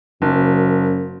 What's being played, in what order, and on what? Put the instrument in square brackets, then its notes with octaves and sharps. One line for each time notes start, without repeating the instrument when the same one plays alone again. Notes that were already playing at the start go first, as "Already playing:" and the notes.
[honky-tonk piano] F#1 [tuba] F#2